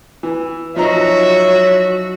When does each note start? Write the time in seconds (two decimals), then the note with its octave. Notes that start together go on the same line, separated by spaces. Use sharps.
0.23 E3
0.76 F3 F#3 D#4 F#4 C#5 E5 A#5